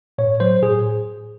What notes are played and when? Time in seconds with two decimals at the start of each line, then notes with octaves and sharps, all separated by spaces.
0.18 A2 C#5
0.40 F#3 C5
0.62 A2 G#4